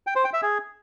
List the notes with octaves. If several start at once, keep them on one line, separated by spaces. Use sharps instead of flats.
G5
C5
G5
E5
G#4